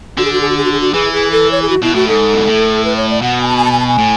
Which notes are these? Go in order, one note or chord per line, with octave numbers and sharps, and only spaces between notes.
D3 F#4
G#4
F#4
G#4
F#4
G#4
F#4
G#4
F#4
E3 G#4
G#4
A4
C#5
G#4
F#4
B2 E4
A2 F#4
G#2 A4
B2
A2
B4
C#5
D5
B2 F#5
G#5
A5
G#5
A5
G#5
A5
G#5
A2